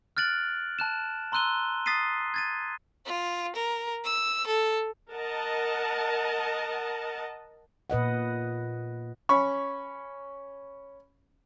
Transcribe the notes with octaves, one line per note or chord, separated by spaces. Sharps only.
F6 F#6 A6 D7 F#7
A5 F#6 E7
A#5 C6 E6 F#6 D#7 G7
D#6 A6 B6 C7 D#7
G#6 A6 D#7
F4
A#4
E6
A4
A#4 D#5 F#5 A5
A#2 B4 D#5 F#5
C#4 B5 C#6